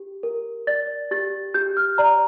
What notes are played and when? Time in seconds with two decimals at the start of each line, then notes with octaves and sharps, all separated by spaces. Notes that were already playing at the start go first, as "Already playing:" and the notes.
Already playing: G4
0.23 A#4
0.67 D5 A6
1.11 G4 A6
1.54 G4 G6
1.77 F6
1.98 D5 A#5